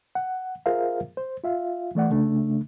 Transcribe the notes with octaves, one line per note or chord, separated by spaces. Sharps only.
F#5
F4 G#4 A#4 C5 E5 F5
C5
F4 E5 F5
E3 A3 D5 F#5
C#3 A3 D4